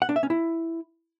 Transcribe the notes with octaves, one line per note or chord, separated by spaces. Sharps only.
F#5
D4
E5
C#4
E4